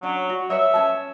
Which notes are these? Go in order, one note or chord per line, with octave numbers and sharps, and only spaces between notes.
F#3 C#4 D4
F#4
B4 C#5 D#5 E5
C#4 C#5 A5